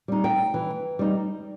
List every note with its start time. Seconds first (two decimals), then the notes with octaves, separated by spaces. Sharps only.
0.08 G3 D#4
0.24 G5
0.54 E3
0.99 G3 D#4